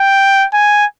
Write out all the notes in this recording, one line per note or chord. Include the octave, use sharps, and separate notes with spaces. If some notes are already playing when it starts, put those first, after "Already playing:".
Already playing: G5
G#5